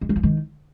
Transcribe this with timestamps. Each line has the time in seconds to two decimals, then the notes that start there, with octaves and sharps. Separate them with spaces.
0.01 G#3
0.09 F#3
0.16 F3
0.23 D#3